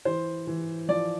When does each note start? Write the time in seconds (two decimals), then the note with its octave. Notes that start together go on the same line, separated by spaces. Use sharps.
0.05 E3 C5
0.47 E3
0.88 F3 D5